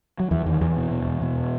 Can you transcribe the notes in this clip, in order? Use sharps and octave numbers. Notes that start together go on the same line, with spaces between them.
F#3
E2 E3
E2 D#3
E2 E3
B2
B2
E2
B2